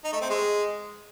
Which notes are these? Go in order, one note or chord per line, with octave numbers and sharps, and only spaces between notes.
D#4
A3
C4
G#3